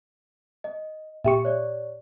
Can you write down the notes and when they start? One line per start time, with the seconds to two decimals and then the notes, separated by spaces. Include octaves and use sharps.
0.64 D#5
1.24 A#2 G4 E5 C#6
1.45 C#5 D5